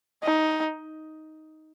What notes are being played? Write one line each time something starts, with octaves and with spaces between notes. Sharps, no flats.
D#4